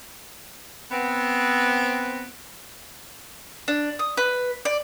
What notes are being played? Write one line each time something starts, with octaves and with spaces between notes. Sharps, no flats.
B3 C4
D4
D#6
B4
D5